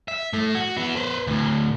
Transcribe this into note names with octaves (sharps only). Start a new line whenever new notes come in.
E5
A2 A3
F#4
B3 E4
B4 C5
D2 A2